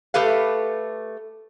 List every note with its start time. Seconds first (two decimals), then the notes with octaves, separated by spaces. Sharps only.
0.14 A3 G4 A4 B4 F5